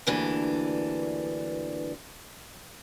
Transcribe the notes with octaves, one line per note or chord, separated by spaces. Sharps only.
D2 G2 E3 A#3 D4